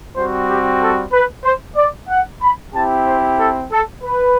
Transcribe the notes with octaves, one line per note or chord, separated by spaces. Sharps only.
G3 C4 F#4 C5
G4
A4
B4
C5
D5
F#5
B5
C4 E4 G4 A5
C5
A4
A4
B4